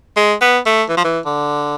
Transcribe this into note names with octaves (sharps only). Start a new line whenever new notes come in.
G#3
B3
A3
E3
F3
E3
D3